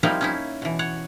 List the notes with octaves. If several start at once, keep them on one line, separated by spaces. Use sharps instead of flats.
F3 G3 A#3 C4 D#4 E4
C#4 D#4 E4
B2 E3
C#5 F#5